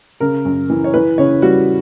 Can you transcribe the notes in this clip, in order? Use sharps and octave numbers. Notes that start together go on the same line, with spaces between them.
C#3 A#4
F#2
E3
C#5
E3 B4
C#3 C#5
G3 F#4